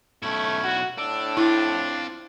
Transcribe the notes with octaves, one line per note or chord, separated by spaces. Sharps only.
B1 A3 C#4 E4
F#4
A2 D4 E6
C4 D4 E4 F4